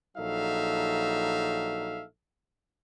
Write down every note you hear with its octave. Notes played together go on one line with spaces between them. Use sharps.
A#1 F#3 D#4 A4 E5 F5